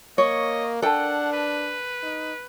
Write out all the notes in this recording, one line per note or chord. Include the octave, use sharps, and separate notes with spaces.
A#3 C#5 D#5 C#6
D4 A4 A#4 F#5 G5 A5
B4
D#4